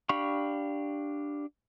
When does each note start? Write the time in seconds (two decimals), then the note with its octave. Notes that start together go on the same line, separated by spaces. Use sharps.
0.09 D4 G4 F5 B5 C#6